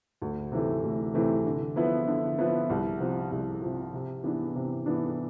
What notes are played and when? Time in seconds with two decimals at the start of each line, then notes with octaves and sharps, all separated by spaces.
0.22 D2
0.52 C3 E3 A3
0.83 D2
1.14 C3 E3 A3
1.46 D3
1.76 F3 B3 E4 B4
2.07 D3
2.38 F3 B3 E4 B4
2.70 C2
3.00 C3 F3
3.31 C2
3.62 C3 F3
3.94 C3
4.24 E3 B3 D4
4.55 C3
4.86 E3 B3 D4